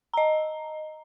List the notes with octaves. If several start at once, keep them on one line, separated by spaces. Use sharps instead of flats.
D#5 A#5